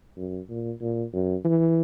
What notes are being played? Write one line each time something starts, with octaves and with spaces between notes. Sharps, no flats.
F#2
A#2
A#2
F#2
E3